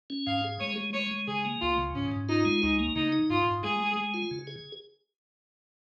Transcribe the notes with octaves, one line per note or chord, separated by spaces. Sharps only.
C#4
G#2 F5
G#4
G#3 C#5
G#3
G#3 C#5
G#3
C#3 G#4
A#3
C#2 F4
C#3
G#2 C#4
G#2
D#4 F4
G#3
C#2 D#4
A#3
C#3 D#4
D#4
G#2 F4
G#2
G#3 G#4
G#3
G#3
F4
C#3
G#4